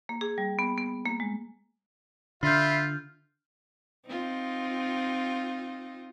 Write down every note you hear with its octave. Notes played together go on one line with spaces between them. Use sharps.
A#3
G#4
G3
B3
B3
A#3
G#3
D3 F4 E5 B5 C6 F6 G6
C4 D#4 F4